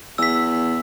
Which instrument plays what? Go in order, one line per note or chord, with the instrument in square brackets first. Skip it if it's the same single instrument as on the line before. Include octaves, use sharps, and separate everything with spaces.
[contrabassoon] E2 [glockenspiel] E6 B6